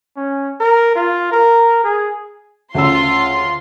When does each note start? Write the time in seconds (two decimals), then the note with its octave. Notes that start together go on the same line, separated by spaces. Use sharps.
0.17 C#4
0.60 A#4
0.95 F4
1.31 A#4
1.84 G#4
2.74 D2 C#3 F4 C6 E6